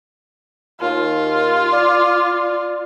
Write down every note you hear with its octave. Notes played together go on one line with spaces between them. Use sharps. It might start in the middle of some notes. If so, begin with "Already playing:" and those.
D#2 F4
D5